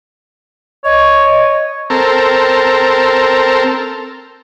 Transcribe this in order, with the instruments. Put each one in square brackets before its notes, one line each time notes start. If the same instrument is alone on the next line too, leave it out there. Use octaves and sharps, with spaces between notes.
[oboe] C#5 [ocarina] D#5
[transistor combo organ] C4 A4 A#4